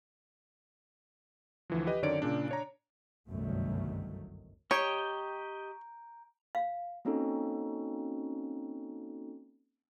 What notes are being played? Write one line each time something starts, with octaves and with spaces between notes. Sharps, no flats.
D2 E3 F3
G4 B4 D#5
F#2 D3 D#3 C#5 D5 D7
A#2 C#3 D4
D4 C#5 A#5
G1 C2 F#2 D#3 F#3 A3
G4 C#5 D#5 G5 A#5 G6 D7
F5
A#3 C4 C#4 D#4 F#4 A4